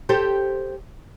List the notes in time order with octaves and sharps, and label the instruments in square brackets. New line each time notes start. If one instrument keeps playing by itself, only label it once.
[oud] G4 A4 C5